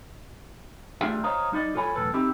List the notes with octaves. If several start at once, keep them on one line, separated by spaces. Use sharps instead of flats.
G3 A3 D4 F4 G#4 E5
C5 C#5 D#5 F5 A#5
G3 D#4 E4 D5 D#5
F4 A4 C#5 G#5 B5
B1 E2 A2 A4 B4
C4 D#4 E4 G4